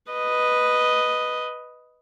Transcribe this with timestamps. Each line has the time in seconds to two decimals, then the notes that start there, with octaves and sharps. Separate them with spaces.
0.12 B4 D#5